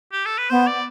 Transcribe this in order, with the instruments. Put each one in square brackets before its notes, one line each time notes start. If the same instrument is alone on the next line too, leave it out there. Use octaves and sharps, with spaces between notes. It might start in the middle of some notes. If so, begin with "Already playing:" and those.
[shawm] G4
A4
B4
[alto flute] B3 [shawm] C5
[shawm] D5